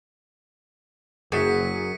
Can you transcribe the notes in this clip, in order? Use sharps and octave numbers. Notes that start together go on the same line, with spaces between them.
F#1 F#2 G#4 B6 C#7 D#7